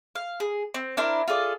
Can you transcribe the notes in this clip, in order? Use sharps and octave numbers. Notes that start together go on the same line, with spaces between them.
F5
G#4
C4
D4 E4 A#4 C5
F4 G#4 A4 D5